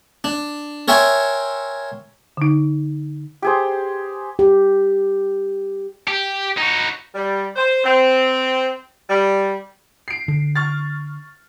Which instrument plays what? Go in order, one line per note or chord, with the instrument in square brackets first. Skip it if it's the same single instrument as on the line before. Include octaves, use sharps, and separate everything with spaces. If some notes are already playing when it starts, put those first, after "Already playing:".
[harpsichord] D4
A#4 C#5 E5 G5 G#5 C6
[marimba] D3 D#4
[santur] G4 G#4 C5
[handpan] G4
[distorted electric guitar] G4
D#4 F#4
[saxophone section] G3
C5
C4
G3
[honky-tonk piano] C7 D7
[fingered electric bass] D3
[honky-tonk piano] C#6 F6 A6